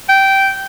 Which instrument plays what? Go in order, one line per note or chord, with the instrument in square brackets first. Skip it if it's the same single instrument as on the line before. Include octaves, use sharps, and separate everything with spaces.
[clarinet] G5